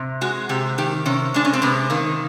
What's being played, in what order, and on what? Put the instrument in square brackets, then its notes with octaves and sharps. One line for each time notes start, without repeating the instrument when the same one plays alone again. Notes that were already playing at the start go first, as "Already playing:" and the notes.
Already playing: [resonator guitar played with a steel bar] C3
G#3 F#4
C3 G4
D#3 G4
C3 C#4
G#3 D4
C#4
C4
C3 B3
D#3 A#3